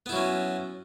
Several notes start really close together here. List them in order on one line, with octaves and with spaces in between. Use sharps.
B3 E4 F#3 C#4